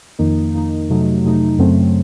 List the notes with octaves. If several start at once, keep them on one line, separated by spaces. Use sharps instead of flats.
F2 D#3 A#3 D#4
F2 D#3 A#3 D#4
F2 C3 F#3 A3 D#4
F2 C3 F#3 A3 D#4
F#2 C#3 F#3 A3 C4